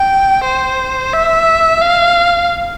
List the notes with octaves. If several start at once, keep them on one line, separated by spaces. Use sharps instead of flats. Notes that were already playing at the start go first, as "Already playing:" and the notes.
Already playing: G5
C5
E5
F5